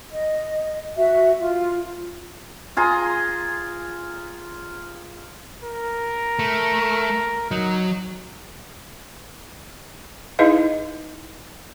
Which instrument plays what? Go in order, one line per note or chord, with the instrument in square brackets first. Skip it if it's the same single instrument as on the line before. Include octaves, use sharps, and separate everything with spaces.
[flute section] D#5
F#4 E5
F4
[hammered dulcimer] F4 G#4 A#5 C6
[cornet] A#4
[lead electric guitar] A3
[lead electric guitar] F#3 [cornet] D#4
[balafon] D#4 E4 G#4 B4 D#5 F5